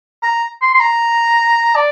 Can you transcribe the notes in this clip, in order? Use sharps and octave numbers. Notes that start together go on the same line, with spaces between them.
A#5
C6
C6
A#5
D5